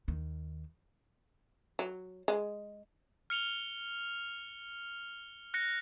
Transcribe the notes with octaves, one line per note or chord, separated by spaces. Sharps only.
D#2 D#3
F#3
G#3
F6 C#7 F7 G7
F#6 A#6 C#7